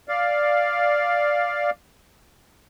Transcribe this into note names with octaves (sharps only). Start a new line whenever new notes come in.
D5 F5